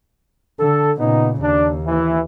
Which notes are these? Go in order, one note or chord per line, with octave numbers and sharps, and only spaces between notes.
D3 A4
A#2 C#3 B3 D#4
D#2 D4
E3